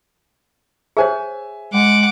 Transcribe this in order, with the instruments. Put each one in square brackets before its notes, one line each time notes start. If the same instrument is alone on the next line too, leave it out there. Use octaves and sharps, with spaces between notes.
[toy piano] G#4 C5 C#5 [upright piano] E5 G#5
[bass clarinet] G#3 [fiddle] F#5 D6